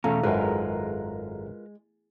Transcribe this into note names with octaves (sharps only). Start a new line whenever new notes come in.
E2 B2 A3 C#4 A4 F5 A#5
G#1 F#2 G#3 F4 A#4 B4